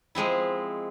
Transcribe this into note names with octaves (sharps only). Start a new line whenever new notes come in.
F3 G#3 C4 E4